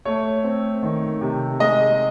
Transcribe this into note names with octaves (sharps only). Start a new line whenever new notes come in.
A3 C#5
C4
D#3
C3
G#3 D#5